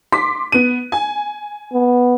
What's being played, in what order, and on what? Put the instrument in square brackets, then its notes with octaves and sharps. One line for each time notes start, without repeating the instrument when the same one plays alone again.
[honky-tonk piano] C6 D6 B6
B3 D#7
G#5
[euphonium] B3